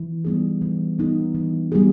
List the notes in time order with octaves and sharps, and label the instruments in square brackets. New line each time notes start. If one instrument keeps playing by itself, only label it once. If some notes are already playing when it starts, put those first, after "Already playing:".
Already playing: [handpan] E3
G3 B3 D#4 G#4
E3
G3 B3 D#4 G#4
E3
G3 B3 D#4 G#4